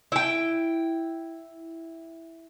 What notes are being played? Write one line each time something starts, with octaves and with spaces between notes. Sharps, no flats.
E4 G5